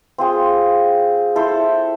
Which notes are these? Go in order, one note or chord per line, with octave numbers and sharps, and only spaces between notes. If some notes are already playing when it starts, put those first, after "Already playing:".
C4 F4 G#4
E4 A4 C5